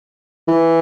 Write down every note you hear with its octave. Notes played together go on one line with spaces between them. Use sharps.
E3